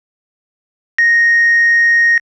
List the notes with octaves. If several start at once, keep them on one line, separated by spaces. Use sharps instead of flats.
A#6